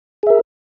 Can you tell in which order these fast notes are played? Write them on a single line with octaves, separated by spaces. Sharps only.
G#4 E5 A#4